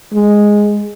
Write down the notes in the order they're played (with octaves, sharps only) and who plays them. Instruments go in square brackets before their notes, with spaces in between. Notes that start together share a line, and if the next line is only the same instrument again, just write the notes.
[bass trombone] G#3